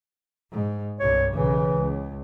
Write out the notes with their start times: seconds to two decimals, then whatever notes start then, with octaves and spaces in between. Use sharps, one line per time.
0.51 G#2
1.00 C2 G2 C#5
1.33 B1 C#3 E3
1.75 C#2